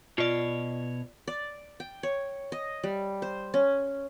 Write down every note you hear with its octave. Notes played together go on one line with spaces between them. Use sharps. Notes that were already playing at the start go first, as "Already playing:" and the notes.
B2 F4 C#5 D5
D5
G5
C#5
D#5
G3
C5
C#4